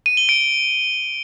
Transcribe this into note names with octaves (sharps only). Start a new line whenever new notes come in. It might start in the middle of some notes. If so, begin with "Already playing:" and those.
D#7
G7
D7